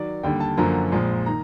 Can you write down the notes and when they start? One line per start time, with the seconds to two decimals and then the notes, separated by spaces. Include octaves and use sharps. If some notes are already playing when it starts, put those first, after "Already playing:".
Already playing: D#3 F#3 D5
0.23 D#2 D3 G3 G5
0.40 A5
0.57 F#2 D3 F3 A#3 A#5
0.92 A#1 A#2 F3 G#3
1.26 D#3 A#5